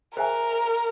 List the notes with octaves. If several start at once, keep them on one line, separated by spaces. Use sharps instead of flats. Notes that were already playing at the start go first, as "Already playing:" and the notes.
G#4 A#4 C5 E5 G#5